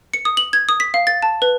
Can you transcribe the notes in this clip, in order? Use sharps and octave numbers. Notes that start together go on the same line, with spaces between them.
C#7
D#6
F#7
G#6
D#6
B6
F5
A6
A5
B4